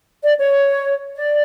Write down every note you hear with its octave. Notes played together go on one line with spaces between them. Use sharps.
D5
C#5
D5